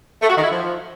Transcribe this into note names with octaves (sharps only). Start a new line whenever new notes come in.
A3
F#4
D#3
E4
F3